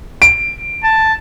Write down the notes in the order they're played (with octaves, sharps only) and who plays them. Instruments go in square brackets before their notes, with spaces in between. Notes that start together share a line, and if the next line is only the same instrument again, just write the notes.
[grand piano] D7
[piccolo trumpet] A5